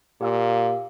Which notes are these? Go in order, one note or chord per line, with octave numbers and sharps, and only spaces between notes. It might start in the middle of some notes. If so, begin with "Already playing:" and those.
A#2 G4 F5 E6